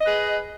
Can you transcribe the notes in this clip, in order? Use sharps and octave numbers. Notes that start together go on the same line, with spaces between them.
G#4 B4 D#5